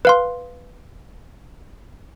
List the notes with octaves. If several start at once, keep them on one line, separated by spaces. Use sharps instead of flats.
B4 F5 C6